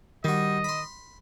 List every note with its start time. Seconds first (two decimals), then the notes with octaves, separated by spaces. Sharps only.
0.24 D#3 G3 F#4 D#5
0.64 B5 C6